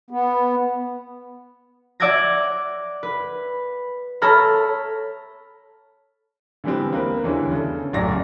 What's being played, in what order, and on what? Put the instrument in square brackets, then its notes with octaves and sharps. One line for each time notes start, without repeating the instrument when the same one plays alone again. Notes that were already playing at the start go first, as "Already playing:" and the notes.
[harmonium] B3
[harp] D5 F#5 D6 E6 G#6 A#6
B4
A4 C#5 A#5 B5 F6
[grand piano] D3 E3 G3 G#3 B3 C4
A#3 C4 B4
E2 D3 E3 G3 C#4 D4
C#3 A4
D1 A1 F#2 C#3 D5 A#6